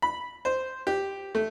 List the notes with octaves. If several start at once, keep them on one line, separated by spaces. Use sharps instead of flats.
B5
C5
G4
A3